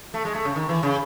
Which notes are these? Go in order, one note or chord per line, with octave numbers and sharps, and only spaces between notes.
A3
G#3
A3
C#3
D#3
E3
C#3